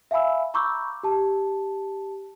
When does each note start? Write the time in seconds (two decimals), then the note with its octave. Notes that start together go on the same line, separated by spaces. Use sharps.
0.11 E5 F5 G#5 B5 E6
0.54 A#5 B5 C#6 D6 E6 G6
1.03 G4 A5